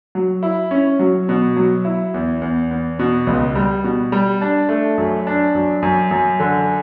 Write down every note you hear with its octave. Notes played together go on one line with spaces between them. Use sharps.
F#3
E4
C#4
F#3
B2
F#3
E4
E2
E2
E2
B2
C#2
G3
B2
G3
D4
A3
F#2
D4
F#2
F#2
F#2
D3